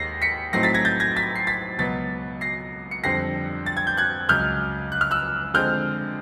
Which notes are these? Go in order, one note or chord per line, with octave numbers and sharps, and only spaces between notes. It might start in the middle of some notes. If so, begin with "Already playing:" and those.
Already playing: D#2 D#3 G#3 A#6 C7
B6 C#7
A2 F#3 A3 C4 D#4 A#6 C7
A6 B6
G#6 A#6
G6 A6
G#6 A#6
A6 B6
C7
A6 B6
C#2 B2 F#3 B3 A6 B6
A#6 C7
C#7
F2 D3 G3 C4 A#6 C7
A6
G#6
G6
F#6 G#6
C#2 C#3 F#3 F6 G6
F#6
F6
E6 F#6
D3 F3 G#3 C4 F6 G6